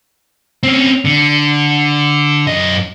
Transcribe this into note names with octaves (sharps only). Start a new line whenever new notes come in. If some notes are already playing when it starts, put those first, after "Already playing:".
C4 C#4
D3
F#2 D#5